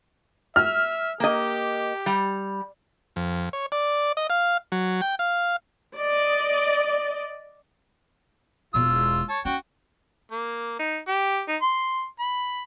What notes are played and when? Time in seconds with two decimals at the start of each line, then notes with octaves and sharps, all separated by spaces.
0.56 E5 F6
1.20 A#3 G4 D#5
2.06 G3
3.16 F2
3.53 C#5
3.72 D5
4.17 D#5
4.30 F5
4.72 F#3
5.01 G5
5.19 F5
5.96 D5 D#5
8.74 E1 B2 F4 E6
9.29 C#5 A5
9.45 C#4 F#4 G5
10.32 A#3
10.79 D#4
11.07 G4
11.48 D#4
11.62 C6
12.20 B5